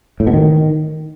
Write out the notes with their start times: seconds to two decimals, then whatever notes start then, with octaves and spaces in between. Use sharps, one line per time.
0.20 A2
0.27 B2
0.34 D#3